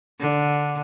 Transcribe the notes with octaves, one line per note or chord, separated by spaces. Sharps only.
D3